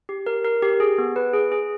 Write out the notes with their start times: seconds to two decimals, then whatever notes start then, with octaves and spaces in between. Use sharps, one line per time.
0.09 G4
0.26 A#4
0.45 A#4
0.62 G4
0.80 G#4
0.98 B3
1.16 B4
1.33 G#4
1.52 G#4